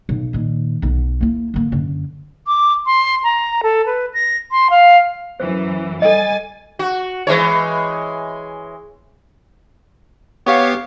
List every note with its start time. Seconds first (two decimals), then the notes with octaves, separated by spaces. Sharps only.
0.09 B1
0.33 A#2 D#3
0.82 B1 B3
1.21 A#3 E4
1.54 D3 A#3
1.72 F#2 D3
2.47 D6
2.86 C6
3.24 A#5
3.63 A4
3.86 B4
4.14 A#6
4.52 C6
4.70 F5
5.40 F#2 E3 C5
6.02 G3 A4 D#5 G#5 A6
6.79 F#4
7.27 E3 G#3 C#5
10.47 B3 G4 C#5 F5